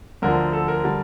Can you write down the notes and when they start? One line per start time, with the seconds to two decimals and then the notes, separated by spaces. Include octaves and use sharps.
0.22 D2 D3 F3 A#4
0.53 A4
0.68 A#4
0.84 D3 G3